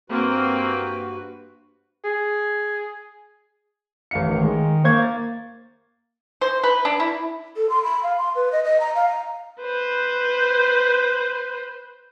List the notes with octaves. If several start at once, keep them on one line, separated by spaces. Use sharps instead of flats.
G2 A#3 C4 F#4 B4
G#4
A1 F5 C#7
D#3
D#3 G#3
A#3 C5 C#6 G#6
A6
C5
B4
D4
E4
A4
C6
B5
F5
C6
B4
D#5
D#5
A#5
F5
A#5
B4 C5